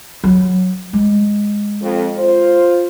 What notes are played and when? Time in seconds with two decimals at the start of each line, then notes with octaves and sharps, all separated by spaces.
0.24 F#3
0.93 G#3
1.81 F2
2.18 F4 C5